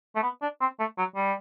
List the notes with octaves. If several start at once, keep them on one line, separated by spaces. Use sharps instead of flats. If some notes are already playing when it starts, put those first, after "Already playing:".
A3
B3
D4
C4
A3
F#3
G3